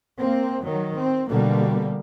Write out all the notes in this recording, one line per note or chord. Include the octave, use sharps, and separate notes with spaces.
A#3 C4
D#3 F#3
C4
B2 D3 G3 A#3